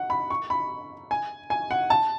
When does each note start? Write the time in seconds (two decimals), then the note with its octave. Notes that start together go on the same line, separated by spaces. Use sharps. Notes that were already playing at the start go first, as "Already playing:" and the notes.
Already playing: F#5
0.10 B5
0.30 C#6
0.50 B5
1.11 G#5
1.50 G#5
1.71 F#5
1.90 A5